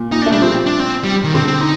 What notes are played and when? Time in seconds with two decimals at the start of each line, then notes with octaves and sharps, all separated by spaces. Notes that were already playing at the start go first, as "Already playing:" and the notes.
Already playing: A#2
0.12 A#2 D#4
0.22 D4
0.26 A3
0.32 G3 D4
0.42 F3 C4
0.66 D4
0.80 C4
1.04 G3
1.24 D#3
1.34 D3 C4
1.47 C4
1.61 D#4